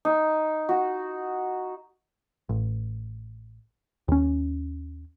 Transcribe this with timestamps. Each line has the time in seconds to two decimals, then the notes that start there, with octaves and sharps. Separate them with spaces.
0.05 D#4
0.69 F#4
2.49 A1
4.08 D#2 C#4